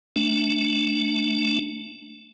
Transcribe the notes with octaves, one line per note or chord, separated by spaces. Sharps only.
A3 D4